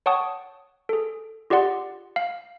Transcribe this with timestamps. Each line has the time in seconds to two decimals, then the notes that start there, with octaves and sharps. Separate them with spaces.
0.06 C#5 F#5 G5 A5 C#6 D#6
0.89 G#4 A4
1.50 F4 G4 G#4 D5 F#5 C6
2.16 F5